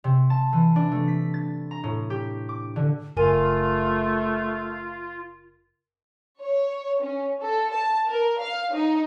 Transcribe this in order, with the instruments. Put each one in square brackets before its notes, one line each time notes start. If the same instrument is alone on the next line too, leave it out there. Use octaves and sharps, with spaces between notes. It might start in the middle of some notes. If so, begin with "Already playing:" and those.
[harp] C3
A5
E3
D4
A3
B6
A6
A#5
A2
G4
D6
D3
[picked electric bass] F#1 [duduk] A3 [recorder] F4 [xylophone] A#4 G#5
[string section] C#5
C#4
A4
A5
A#4
F5
D#4